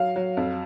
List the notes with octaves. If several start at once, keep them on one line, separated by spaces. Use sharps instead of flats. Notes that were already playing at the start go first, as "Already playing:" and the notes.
Already playing: F#3 F5
F#3
F2